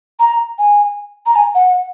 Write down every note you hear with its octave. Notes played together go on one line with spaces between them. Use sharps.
A#5
G#5
A#5
G#5
F#5